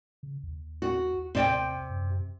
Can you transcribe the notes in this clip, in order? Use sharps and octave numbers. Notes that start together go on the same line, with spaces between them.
C#3
D#2
F#4
D#2 C3 D5 G5
F#2